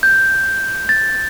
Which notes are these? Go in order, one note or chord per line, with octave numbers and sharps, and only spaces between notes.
G6
A6